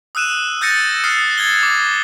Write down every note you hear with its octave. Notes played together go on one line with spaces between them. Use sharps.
D#6 E6 F#6 D#7 E7
E6 G6 A6 A#6 C#7 D#7
D#6 F6 F#6 C7 E7
G#6 A6 G7
D6